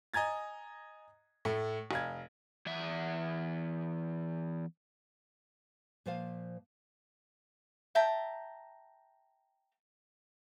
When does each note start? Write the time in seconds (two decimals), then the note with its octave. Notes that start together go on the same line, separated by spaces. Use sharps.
0.14 D#5 G#5 A#5 G#6 A6
1.45 A2 A3
1.91 F1 F5 G#6
2.66 E2 E5
6.06 A#2 F3 C5 F5
7.95 E5 G5 A5 A#5